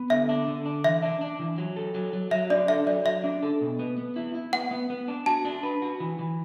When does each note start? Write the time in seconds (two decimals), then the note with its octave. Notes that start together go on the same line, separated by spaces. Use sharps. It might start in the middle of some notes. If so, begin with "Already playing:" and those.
Already playing: B3
0.10 D3 E5
0.29 D4
0.47 D3
0.66 D4
0.84 E3 E5
1.03 D4
1.21 D4
1.40 E3
1.58 F#3
1.76 A4
1.95 F#3
2.13 F#3
2.31 F#3 E5
2.50 D4 D5
2.68 A4 E5
2.87 F#3 D5
3.05 F#3 E5
3.24 D4
3.43 A4
3.61 B2
3.79 B3
3.98 B3
4.16 E4
4.35 E4
4.53 B3 F#5
4.71 B3
4.90 B3
5.08 D4
5.26 F#4 A5
5.45 D4
5.63 B4
5.82 F#4
6.00 E3
6.19 E3